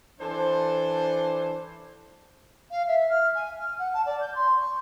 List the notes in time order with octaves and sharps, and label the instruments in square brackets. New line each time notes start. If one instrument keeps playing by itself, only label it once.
[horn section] E3 D4 A4 C5
[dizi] F5
E5
F6
G#5
F6
F#5
A5
D5
G6
C6
C#6